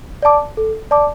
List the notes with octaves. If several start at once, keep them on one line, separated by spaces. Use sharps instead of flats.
D5 A5 D6
A4
D5 A5 D6